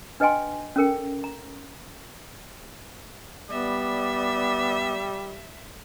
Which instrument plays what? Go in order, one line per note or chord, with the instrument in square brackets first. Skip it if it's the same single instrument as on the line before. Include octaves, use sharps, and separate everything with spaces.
[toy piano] D4 B4 D#5 G5 G#5 C6
C#4 A4 A#4 G5
A#5
[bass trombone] G3 [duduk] B3 [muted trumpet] D5 [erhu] E5